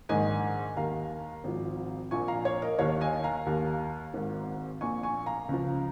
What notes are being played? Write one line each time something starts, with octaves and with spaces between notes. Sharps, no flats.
A#1 G#2 D#3 D#5 G#5
D#2 D#3 F5 A#5
G#1 G#2 F3
A#1 A#2 F3 G#5 C#6
F5 A#5
C#5 F5
A#4 D#5
D#2 D#3 C#5 F5
D#5 G#5
F5 A#5
D#2 D#3
G#1 G#2 D#3
A#1 A#2 F3 G#5 C#6
G#5 C#6
F5 A#5
C#2 C#3 F3